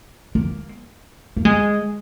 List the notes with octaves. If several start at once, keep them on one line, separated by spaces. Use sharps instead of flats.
A#3
A#3
G#3